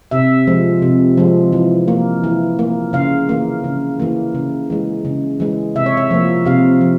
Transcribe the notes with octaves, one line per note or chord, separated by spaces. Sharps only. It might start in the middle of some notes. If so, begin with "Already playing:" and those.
C3 E5
F3 G#3
C3
F3 G#3
E3
A#3
E3
A#3
C#3 F5
E3 A#3
C#3
E3 A#3
C#3
E3 G#3
C#3
E3 G#3
C3 E5
C#5
E5
F3 A#3
C3 F5
F3